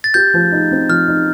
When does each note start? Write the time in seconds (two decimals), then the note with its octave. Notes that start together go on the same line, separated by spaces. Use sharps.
0.04 A6
0.14 G4 G6
0.34 F3
0.52 D#4
0.71 C4
0.89 F3 F6
1.08 D#4